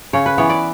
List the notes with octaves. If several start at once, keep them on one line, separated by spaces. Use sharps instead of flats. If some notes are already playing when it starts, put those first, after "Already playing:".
C#3 C#5
B4
E3 B3 C#5
D5